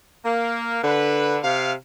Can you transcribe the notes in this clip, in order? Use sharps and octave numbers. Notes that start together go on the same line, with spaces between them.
A#3
D3 B4
C3 F5